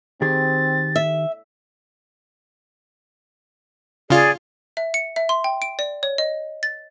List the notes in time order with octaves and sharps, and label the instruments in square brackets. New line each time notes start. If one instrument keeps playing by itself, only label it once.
[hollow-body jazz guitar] D#3 G4 G#4 [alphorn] C4 [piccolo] A6
[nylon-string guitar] E5
[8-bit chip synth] C#3 F4 [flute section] G#4 D5
[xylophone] E5
C#7
E5
C6
G5
D7
D5
C#5
D#5
A6